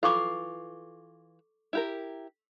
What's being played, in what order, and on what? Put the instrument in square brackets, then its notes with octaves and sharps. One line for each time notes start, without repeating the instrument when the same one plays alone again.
[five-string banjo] E3 F4 [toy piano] A4 C#6 D6
[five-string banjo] E4 G4 A#4